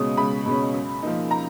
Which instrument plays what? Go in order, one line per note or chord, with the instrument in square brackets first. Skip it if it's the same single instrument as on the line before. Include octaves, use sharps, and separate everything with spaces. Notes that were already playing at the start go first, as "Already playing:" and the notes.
Already playing: [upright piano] C#2 B2 G#3 C#4 D#6
C#2 B5
B2 G#3 C#4
F#2
F3 A#3 D#4
A#5